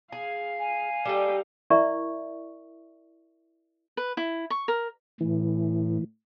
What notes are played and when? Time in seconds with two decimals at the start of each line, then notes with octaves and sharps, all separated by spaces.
0.12 G#4 F5
0.59 G#5
1.05 G3 D#4 G4 A4
1.70 E4 A#4 D5 E5 C#6
3.97 B4
4.17 E4
4.50 C#6
4.68 A#4
5.21 A2 E3